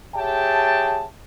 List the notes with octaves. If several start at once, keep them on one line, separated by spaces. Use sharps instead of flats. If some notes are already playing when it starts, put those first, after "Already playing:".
G4 G#4 C#5 E5 G5 A5